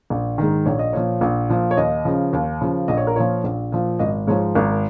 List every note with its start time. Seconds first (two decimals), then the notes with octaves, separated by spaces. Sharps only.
0.10 A#1
0.38 G#2 D#3
0.65 A#1 C#5
0.79 D#5
0.93 A#2 F3 C#5
1.21 A#1
1.49 A#2 F3
1.71 C#5
1.77 D#2 D#5
2.05 C#3 F3
2.33 D#2
2.61 C#3 F3
2.88 A#1 D#5
2.97 C#5
3.07 A#4
3.16 A#2 F3 C#5
3.44 A#1
3.72 A#2 F3
3.99 G#1 D#5
4.27 G#2 F3 C#5
4.55 G#1 A#4